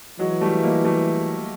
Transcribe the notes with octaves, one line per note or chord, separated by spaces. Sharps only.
E3 F#3 G#3
G3 A3
G#3 A#3
G3 A3